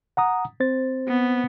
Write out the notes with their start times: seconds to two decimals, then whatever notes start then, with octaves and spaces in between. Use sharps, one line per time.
0.17 F#5 A#5 D#6
0.60 C4 C5 A6
1.08 B3